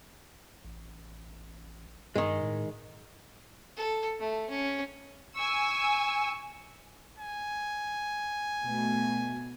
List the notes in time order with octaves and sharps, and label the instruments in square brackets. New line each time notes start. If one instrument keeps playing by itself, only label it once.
[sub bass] A1
[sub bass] G2 [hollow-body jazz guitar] D#3 G#3
[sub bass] A2
[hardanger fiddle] A4
A3
C#4
[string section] G#5 E6 [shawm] C#6
[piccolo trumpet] G#5
[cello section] B2 A3